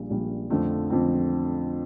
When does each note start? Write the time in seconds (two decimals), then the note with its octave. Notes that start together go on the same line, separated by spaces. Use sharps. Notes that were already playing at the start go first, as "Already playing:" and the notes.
Already playing: A#1 A#2 G3
0.10 A#1 A#2 G3
0.50 F2 D3 F3 A3 C4
0.90 F2 D3 F3 A3 C4